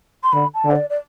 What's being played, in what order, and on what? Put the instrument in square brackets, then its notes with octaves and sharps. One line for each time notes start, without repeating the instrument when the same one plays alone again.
[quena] C6
[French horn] D3 [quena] B5
[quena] A5
[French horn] D3
[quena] C5
D5
D5